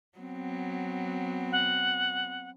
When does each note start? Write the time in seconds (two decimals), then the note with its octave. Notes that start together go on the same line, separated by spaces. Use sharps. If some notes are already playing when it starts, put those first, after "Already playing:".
0.19 F#3 B3 C4
1.52 F#5